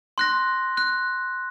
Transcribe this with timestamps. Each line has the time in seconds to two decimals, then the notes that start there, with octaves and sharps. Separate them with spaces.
0.18 C6 F#6 A#6
0.77 F#6